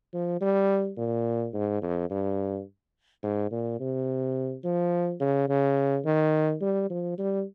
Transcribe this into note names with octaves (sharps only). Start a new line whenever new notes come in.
F3
G3
A#2
G#2
F2
G2
G#2
A#2
C3
F3
C#3
C#3
D#3
G3
F3
G3